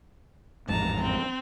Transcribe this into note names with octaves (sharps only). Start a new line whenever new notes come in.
A1 F2 G#2 A5 A#5
C4